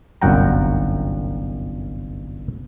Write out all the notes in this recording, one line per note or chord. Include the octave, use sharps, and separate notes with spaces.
G1 C2 F#2 F#5 G5 A#5